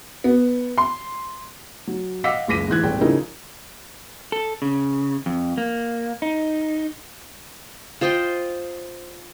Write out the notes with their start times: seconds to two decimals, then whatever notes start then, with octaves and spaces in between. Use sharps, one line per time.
0.24 B3
0.78 C6
1.87 F#3
2.24 D#5 F5 F#5 D6 E6 B6
2.48 F#1 C#2 D6 A#6 B6 D#7
2.68 G#2 E3 F#6 G#6
2.83 D#1 G#1 G#4 G5
3.01 C#3 F3 D#4 E4 G#4 A#4
4.32 A4
4.62 C#3
5.26 F2
5.58 A#3
6.22 D#4
8.01 F4 C5 D#5 G5